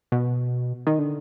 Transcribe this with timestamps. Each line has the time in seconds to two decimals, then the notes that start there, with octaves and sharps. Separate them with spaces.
0.12 B2
0.87 D#3
0.99 D3